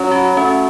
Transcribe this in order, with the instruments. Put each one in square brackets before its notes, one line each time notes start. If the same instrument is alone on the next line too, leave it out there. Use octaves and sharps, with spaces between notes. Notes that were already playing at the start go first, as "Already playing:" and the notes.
Already playing: [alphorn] F#3 [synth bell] C#4
[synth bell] F#4
[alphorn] A3 [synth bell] C#4